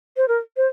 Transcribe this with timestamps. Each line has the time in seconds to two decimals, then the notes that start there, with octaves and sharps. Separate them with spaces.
0.17 C5
0.28 A#4
0.57 C5